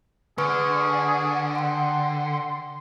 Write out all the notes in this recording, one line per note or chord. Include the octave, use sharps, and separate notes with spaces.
D3 G#4 B4 C#6 F6
F#5 G5 C6